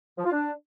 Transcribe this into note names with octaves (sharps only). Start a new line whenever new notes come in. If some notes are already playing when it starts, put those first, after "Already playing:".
F3
F4
D4